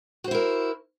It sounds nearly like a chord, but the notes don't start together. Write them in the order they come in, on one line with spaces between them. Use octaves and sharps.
F#4 C5 E4 A#4